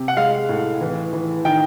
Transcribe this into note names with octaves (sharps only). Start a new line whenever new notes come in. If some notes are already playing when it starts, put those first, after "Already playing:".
Already playing: C3
F#5
G#3 F5
A2
E3
E3
D#3 G5